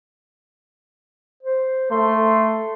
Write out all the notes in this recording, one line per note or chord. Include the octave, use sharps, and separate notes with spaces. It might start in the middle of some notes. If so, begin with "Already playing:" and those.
C5
A3 C6